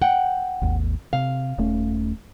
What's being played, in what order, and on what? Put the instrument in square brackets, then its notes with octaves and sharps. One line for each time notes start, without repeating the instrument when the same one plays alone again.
[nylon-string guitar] F#5 G5
[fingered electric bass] G#1 D#2
[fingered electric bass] C3 [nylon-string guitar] F5
[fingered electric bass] D#1 A3 C#4